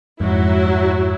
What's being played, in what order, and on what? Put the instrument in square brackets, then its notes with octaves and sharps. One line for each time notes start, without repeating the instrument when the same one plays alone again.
[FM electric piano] F2 G#2 [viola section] F#3 E4